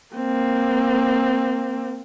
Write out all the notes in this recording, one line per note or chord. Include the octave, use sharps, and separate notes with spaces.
A#3 C4